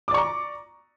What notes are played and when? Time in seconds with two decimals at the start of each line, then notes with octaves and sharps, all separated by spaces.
0.08 D6
0.11 D5
0.14 C#6
0.17 A#5